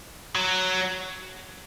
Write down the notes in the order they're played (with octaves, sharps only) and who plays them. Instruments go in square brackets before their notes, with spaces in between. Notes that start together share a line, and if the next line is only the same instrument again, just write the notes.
[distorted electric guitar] F#3